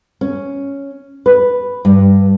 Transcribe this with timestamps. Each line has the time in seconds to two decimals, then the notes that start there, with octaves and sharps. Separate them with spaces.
0.21 C#4
1.26 B4
1.85 G2